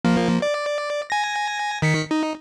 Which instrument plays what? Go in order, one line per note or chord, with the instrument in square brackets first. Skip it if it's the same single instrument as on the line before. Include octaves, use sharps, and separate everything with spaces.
[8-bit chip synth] F3 A#3
D5
G#5 A#6
D#3 B6 C#7
D#4